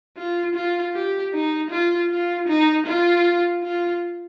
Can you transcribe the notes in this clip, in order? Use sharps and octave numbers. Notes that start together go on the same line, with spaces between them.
F4
F4
G4
D#4
F4
F4
D#4
F4
F4